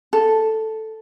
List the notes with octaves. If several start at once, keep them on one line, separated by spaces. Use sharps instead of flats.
A4